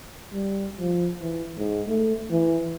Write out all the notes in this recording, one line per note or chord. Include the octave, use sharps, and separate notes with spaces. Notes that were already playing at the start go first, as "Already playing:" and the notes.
G3
F3
E3
G#2
A3
E3